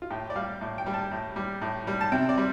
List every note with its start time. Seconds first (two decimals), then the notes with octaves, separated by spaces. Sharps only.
0.02 F4
0.11 A2 G4
0.30 D5
0.35 G3 F5
0.61 A2
0.78 G5
0.86 G3
0.94 A5
1.11 A2
1.36 G3
1.62 A2
1.87 G3
2.01 A5
2.12 C3 G5
2.29 D5
2.38 G3